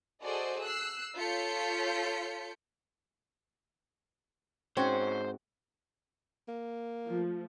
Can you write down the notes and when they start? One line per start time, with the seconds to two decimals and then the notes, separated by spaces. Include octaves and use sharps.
0.24 F#4 G#4 A4 C5 D5 D#5
0.62 E6 F#6 C7
1.18 F4 A4 C#5 G6 B6 C#7
4.77 G#2 C4 C#4 F#4 C5 F#5
6.48 A#3
7.07 F3 A3